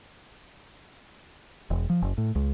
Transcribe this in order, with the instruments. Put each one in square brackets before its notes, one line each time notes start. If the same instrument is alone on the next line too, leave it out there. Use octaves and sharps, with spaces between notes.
[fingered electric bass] E1
F3
F#1
A2
C#2